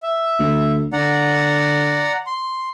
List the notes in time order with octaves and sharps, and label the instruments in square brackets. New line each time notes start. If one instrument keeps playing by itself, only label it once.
[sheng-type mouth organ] E5
[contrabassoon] D2
[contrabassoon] D3 [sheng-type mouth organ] D5 F#5 A#5
[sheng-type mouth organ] C6